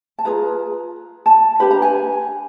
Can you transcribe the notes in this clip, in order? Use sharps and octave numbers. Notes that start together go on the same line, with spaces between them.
A5
F4 G#4 B4 A#5
A5
D4 G4 B4 B5
A#5
G#5